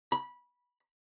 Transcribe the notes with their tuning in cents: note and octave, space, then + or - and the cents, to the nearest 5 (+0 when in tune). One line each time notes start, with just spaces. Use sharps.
B5 -15